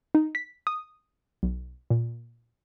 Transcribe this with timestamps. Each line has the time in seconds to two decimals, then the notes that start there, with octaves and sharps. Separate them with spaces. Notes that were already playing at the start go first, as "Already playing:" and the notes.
0.15 D#4
0.35 B6
0.67 D#6
1.43 B1
1.90 A#2